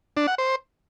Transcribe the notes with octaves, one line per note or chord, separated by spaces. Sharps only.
D4
F#5
C5